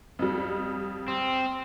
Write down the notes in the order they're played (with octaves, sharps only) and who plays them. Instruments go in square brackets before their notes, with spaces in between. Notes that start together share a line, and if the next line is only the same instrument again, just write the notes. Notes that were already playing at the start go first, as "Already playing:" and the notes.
[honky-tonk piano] F2 G3
[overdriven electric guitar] C4